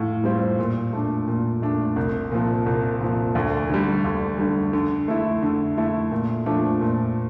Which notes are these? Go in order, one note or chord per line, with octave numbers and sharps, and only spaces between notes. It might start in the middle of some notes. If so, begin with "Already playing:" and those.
Already playing: A2 F4
G3 C4 F4
A#2
A3 D4
A#2
A3 D4
C2
A#2 F3
C2
A#2 F3
D2
D3 G3
D2
D3 G3
D3
A3 E4
D3
A3 E4
A#2
F3 A3 D4
A#2